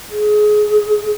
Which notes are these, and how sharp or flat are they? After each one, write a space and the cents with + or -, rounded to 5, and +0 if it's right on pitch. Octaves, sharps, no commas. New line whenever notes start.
G#4 +20